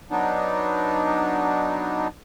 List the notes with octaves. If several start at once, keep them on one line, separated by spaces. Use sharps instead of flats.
F#3 B3 D4 D#4